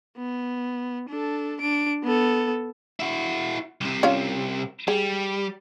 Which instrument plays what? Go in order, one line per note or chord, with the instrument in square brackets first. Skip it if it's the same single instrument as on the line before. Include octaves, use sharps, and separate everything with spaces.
[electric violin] B3
D4 A4
D4 D7
B3 A4
[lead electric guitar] E4 F#4
C2 C3
[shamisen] C#4 F4 F5
[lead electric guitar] G3 [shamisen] G#4